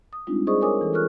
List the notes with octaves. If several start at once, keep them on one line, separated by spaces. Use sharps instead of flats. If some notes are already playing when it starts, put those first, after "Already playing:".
D#6
G3 G#3 C4 D4 D#4 F4
G#4 C5 D5 D#5 C#6 D#6
A#4 C#5 G#5 D6 D#6
E3 A4
F4 A4 A#4 C#6 F6 F#6